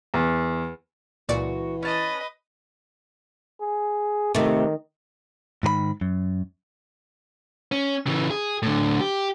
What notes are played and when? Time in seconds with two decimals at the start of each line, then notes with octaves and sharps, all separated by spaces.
0.14 E2
1.29 C#2 A#2 E3 F#4 D5
1.83 C#4 B4 D#5 A5
3.61 G#4
4.35 C3 D#3 A3
5.63 G#2 D#3 A#4 B5
6.01 F#2
7.72 C#4
8.07 C#3 E3
8.30 G#4
8.62 A2 D3
9.00 G4